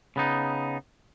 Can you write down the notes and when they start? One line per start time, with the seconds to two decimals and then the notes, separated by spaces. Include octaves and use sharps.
0.16 C#3 B3 D#4